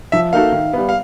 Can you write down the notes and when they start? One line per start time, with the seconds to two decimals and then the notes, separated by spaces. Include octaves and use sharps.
0.12 F3 E5
0.33 A#3 D#4 F#4 A4 F5
0.52 D#3
0.73 G3 B3
0.89 F5